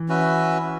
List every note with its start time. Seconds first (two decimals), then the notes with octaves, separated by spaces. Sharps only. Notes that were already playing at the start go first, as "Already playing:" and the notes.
Already playing: E3
0.08 C#4 F#4 B4 E5